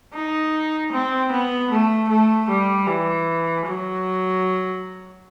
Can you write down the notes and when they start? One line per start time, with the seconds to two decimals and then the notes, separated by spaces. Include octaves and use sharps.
0.13 D#4
0.92 C4
1.32 B3
1.71 A3
2.09 A3
2.49 G3
2.87 E3
3.66 F#3